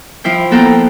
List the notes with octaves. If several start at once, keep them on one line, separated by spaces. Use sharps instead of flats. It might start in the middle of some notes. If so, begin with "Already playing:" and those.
F3 E4 C5 G5
A#3 B3 A4 F#5 G5 A#5